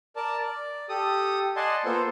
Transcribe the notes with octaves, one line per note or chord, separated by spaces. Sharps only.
A#4 D5 A5
D5
G4 A4 D#6
D5 D#5 F#5 G#5 A5 C6
A#3 B3 F4 A4 C5